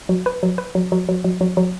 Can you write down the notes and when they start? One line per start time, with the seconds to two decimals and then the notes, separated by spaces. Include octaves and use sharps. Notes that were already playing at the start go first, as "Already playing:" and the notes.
0.09 F#3
0.26 B4
0.43 F#3
0.58 B4
0.75 F#3
0.92 F#3
1.09 F#3
1.24 F#3
1.41 F#3
1.57 F#3